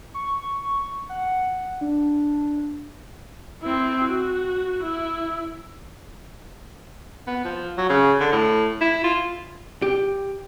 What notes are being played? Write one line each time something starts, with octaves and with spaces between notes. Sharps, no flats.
C#6
F#5
D4
C4 E4
F#4
E4
B3
F3
F#3
C#3
D3
A2
E4
F4
G4